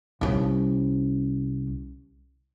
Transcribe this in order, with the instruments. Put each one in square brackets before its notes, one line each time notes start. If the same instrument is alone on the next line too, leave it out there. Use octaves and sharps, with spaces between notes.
[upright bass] C2 C#4